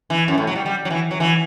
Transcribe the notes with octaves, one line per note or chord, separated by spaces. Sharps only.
E3
F#2
A2
F#3
G3
G3
F#3
E3
F#3
E3